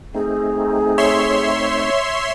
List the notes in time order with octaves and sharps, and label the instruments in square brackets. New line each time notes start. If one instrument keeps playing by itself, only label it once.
[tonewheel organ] A3 C4 D#4 [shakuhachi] G#4
[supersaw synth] C#5 E5 C6